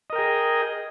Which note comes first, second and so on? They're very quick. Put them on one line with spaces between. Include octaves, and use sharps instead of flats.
D#5 A#4 G5 G#4